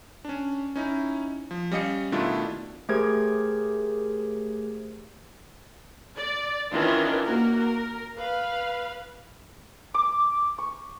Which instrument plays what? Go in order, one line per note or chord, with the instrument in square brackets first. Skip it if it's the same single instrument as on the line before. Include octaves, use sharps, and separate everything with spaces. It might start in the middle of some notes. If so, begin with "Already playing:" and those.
[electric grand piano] C#4 D4
C#4 D#4 E4
F3
G3 C#4 D#5 F5 C#7
B2 D#3 A3 D4 E4 F4
[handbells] A3 G4 G#4 A#4 C5 G#6
[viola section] D5
D#3 E3 C#4 D4 F4
A#3 F#4 A#4
A#4
B4 F5
[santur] D6
C#6